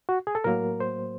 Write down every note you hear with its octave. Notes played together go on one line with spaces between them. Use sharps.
F#4
G#4
A4
A2 F#3 A#3 A#4
C5